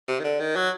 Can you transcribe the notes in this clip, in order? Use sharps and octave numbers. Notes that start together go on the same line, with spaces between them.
C3
D#3
D3
D#3
F#3